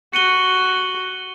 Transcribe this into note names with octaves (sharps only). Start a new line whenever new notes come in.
F#4 C#7 D#7 G7